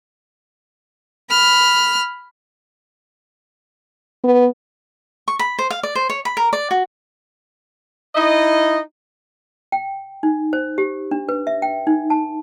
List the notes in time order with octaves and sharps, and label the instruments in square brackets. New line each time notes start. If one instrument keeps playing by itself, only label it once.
[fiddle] B5 F6
[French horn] B3
[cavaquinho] C#6
B5
C5
F5
D5
C5
C#5
B5
A#4
D5
F#4
[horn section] D#4 E4 D#5
[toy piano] G5
D#4
C5
G4
D4
B4
E5
G5
D#4
A5